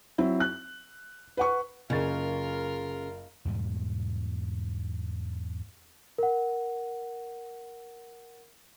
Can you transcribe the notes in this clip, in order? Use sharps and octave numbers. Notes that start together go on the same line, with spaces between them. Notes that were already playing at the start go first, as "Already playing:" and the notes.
F#3 C4 E4
F#6
B4 F#5 C#6
F#1 C#3 F4 A#4 A6
E2 G#2 B2 G3
A#4 F#5